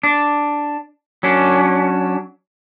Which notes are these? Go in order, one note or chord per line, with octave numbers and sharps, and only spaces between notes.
D4
F#3 C#4 D4